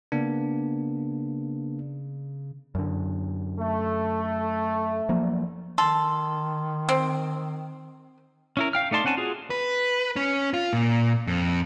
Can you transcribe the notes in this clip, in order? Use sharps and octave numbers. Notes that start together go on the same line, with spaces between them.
C#3 A#3 B3 D4
F#2 D3
A3
F3 F#3 A#3
D#3 A4 C6
C4
C#4 E4 A#4
F5 G5 F6
A3 D#4 D5 A5 C6
C4 C#4 F#5 G#5 A5
F4 F#4 G#4
B4
C#4
F4
A#2
F2